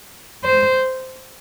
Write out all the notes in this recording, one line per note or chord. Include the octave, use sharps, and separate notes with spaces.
C5